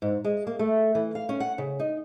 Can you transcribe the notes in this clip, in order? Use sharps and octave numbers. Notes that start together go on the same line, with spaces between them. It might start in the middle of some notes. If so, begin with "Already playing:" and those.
G#2
G#3
A#3
A3
E3
F5
C#4
F#5
C#3
D#4